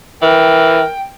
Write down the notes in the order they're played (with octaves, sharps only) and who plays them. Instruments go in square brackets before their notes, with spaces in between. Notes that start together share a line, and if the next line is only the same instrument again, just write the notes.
[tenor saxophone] E3 [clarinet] A#4 [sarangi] G5